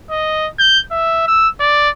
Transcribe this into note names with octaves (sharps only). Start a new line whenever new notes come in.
D#5
G6
E5
E6
D5